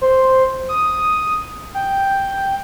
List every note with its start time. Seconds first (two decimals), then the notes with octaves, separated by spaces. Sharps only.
0.01 C5
0.69 D#6
1.74 G5